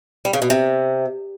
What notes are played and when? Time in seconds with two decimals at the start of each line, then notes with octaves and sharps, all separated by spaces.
0.25 G3
0.33 C#3
0.42 B2
0.50 C3